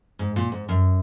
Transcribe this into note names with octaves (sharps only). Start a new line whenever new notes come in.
G#2
A#2
G#2
F#2